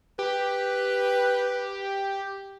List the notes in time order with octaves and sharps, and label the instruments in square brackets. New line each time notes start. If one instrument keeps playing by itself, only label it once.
[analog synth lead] G4 [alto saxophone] B4